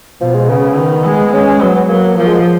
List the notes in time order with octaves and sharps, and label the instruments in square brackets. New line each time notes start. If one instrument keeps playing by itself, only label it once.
[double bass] B2 [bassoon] F3
[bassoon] G#3
[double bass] C#3 [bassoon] B3
[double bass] D#3
G#3
[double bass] G#3 [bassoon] C#4
[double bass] F#3 [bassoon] B3
[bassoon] B3
[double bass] F#3 [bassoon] A#3
[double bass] F3 [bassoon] A#3
[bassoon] G#3